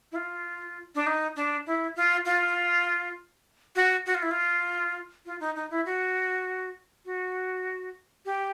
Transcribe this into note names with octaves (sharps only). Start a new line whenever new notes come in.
E4
F4
D4
D#4
D4
E4
F4
F4
F#4
F#4
F4
E4
F4
F4
D#4
D#4
E4
F#4
F#4
G4